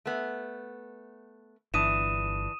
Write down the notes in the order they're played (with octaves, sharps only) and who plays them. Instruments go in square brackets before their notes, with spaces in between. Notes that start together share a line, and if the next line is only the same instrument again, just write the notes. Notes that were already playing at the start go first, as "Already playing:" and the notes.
[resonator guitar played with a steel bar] A3 B3
[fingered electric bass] G1 [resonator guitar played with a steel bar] E3 D4 [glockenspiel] D#6 D#7 E7